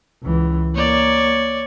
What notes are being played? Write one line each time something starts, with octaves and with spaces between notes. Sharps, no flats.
C#2 E3
A#3 C#5 D5